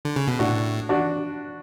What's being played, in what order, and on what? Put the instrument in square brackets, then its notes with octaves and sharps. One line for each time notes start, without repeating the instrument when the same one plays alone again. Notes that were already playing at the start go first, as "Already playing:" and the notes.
[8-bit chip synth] D3
C#3
B2
[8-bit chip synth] A2 [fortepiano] D4 F#4
[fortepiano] D4 F#4